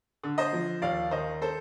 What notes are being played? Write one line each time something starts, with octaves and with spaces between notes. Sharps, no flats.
D3
C5 D#5
F3
D#2 D5 F5
D#3 C5 D#5
A4 C5